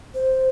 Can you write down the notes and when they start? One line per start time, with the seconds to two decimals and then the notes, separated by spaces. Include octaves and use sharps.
0.14 C5